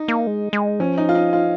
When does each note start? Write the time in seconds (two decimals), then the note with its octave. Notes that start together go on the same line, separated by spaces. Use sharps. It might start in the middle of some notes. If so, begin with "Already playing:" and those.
Already playing: D#4
0.08 A#3
0.27 G#3
0.53 G#3
0.80 F3 C#4
0.98 D#4
1.09 F4
1.15 D#4
1.33 F4